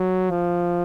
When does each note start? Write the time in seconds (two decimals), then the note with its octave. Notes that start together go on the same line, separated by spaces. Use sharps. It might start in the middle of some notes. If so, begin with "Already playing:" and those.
Already playing: F#3
0.30 F3